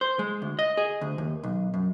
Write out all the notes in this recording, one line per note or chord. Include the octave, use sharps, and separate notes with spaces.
C5
G#3
D2
D#5
G#4
D2
D#2
B1
F#2